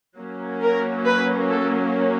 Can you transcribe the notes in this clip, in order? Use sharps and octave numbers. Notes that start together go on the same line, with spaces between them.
F#3 A#3 C#4
A#4
B4
A4